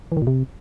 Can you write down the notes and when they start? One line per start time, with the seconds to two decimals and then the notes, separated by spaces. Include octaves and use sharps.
0.12 E3
0.17 D#3
0.22 A#2
0.27 C3